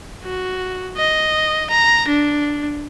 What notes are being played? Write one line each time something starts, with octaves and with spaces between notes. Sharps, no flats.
F#4
D#5
A#5
D4